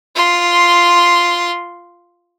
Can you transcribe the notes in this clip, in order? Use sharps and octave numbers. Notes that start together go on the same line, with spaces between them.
F4 C6